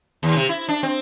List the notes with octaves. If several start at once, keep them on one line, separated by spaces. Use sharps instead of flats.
D#2
C3
E4
D4
C4